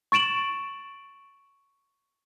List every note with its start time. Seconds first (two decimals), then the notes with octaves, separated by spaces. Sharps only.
0.12 C#6 A6 D7 E7 F#7